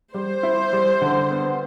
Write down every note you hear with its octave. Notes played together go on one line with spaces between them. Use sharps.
G3 C5
E4
G3
D3
B3